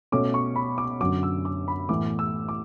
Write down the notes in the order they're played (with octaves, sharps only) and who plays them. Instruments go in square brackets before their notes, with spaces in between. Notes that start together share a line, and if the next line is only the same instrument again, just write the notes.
[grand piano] B2 A3 C#4 D6
C#6
B5
D6
F#2 D3 F#3 D6
E6
D6
B5
A2 E3 B3 D6
E6
D6